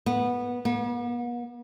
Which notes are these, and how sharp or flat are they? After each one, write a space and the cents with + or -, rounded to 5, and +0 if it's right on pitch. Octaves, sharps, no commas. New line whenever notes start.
B3 -15
B3 -45